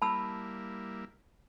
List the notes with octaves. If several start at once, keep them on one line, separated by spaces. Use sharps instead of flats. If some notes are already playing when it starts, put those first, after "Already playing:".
G3 A#3 E4 A5 B5 E6